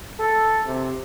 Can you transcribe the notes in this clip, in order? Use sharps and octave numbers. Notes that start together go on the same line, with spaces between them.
A4
C3